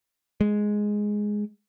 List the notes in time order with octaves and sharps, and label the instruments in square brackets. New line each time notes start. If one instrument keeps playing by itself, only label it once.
[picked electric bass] G#3